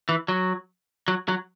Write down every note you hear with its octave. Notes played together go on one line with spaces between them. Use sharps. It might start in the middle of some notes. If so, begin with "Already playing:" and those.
E3
F#3
F#3
F#3